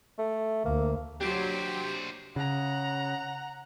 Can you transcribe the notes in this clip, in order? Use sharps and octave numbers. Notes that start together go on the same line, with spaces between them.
A3
D2 A#3
F#3 D4 G4 C5
C#3 F#5 A#5